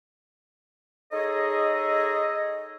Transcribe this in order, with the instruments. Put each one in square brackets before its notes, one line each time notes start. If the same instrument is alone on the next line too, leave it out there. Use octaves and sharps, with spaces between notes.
[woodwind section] D#4 G#4 A4 C#5 D#5